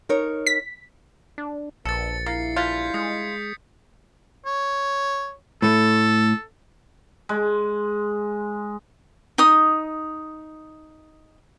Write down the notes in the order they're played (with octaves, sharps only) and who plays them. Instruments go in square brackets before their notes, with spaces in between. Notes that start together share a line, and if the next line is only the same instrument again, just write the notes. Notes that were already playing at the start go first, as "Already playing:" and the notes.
[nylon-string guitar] D#4 A#4 C#5
[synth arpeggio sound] B6
[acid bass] D4
[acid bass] A#1 [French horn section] A#3 D4 B4 [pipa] A4 [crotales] A6 C#7
[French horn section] G3 E4 [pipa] A#3 [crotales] A6 C7
[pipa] E3 D4 F4 [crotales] G6 G#6 B6
[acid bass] G#3 [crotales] D#6 C#7
[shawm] C#5
[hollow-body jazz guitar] A2 A3 [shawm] A4
[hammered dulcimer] G#3
[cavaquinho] D#4 D#6